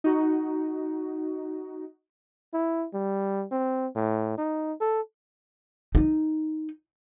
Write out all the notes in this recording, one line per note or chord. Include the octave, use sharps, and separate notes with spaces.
D#4 F#4
E4
G3
C4
A2
D#4
A4
D#4